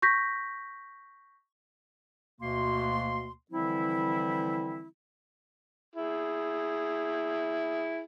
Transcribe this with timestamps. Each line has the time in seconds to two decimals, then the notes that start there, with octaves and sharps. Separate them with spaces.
0.02 C#6 G6 A#6 B6
2.41 D2 B2 A#3 C6
3.51 D3 E3 F3 G3 C4 E4
5.95 E4 G#4